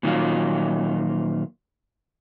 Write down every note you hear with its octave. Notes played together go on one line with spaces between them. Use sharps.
A#2 D#3 F#3 F4